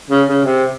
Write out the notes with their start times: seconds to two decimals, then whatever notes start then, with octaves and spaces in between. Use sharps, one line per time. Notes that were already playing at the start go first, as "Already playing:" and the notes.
0.11 C#3
0.28 C#3
0.45 C3